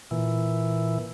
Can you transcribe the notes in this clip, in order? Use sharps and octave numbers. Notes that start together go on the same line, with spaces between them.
A#2 E3